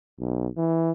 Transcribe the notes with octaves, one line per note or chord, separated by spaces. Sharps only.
B1
E3